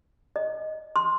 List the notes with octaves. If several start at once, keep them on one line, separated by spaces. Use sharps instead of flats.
D#5
C6